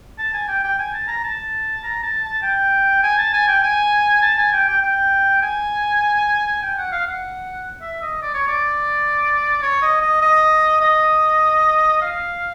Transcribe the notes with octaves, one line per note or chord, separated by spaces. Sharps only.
A5
G#5
G5
G5
G#5
A5
A#5
A5
A#5
A5
A5
G5
G#5
A5
G#5
G5
G#5
A5
G#5
G5
G5
G5
G#5
G5
F#5
F5
F#5
E5
D#5
D5
C#5
D5
C#5
D#5
D#5
D#5
D#5
F5